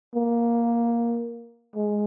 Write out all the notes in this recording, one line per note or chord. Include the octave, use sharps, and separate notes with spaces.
A#3
G#3